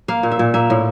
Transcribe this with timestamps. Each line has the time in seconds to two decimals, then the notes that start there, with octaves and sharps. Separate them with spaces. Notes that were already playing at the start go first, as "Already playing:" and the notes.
0.08 A#3 F5
0.23 A#2
0.31 E5
0.39 A#2
0.54 A#3 E5
0.70 A2